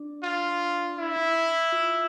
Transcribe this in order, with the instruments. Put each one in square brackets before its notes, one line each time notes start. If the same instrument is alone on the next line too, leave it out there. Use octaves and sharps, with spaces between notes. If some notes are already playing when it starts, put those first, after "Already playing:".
Already playing: [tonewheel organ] D4
[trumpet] F4
E4
[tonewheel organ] F4